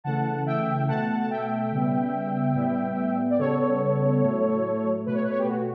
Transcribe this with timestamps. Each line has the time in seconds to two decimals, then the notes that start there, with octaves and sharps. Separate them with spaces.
0.04 C#3 E3 A3 F#5 A5
0.46 E5 G5
0.87 B2 A3 F#5 A5
1.20 A5
1.30 E5 G5
1.72 C#3 G3 B3
2.55 A2 G3 B3
3.30 D5
3.39 C#3 G3 B3 A4 C#5
4.22 A2 F#3 A3
5.06 B2 A3 B4
5.14 C#5
5.23 B4
5.30 C#5
5.39 G4 B4
5.48 F#4